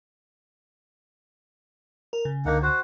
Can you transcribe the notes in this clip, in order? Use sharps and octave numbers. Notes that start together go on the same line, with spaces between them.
A#4
C#3
C#2 D3 A#3 D#4 F#5
F#4 C5